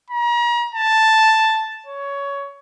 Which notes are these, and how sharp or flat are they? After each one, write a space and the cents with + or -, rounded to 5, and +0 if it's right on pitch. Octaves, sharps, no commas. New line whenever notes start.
A#5 +40
A5 +0
C#5 +15